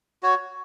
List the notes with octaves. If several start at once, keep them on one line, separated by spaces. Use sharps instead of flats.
F#4 C#5